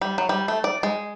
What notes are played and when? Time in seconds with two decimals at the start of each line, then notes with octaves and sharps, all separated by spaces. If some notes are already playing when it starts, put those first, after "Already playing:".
0.01 G3
0.18 F#3
0.29 G3
0.48 A3
0.64 D5
0.83 G#3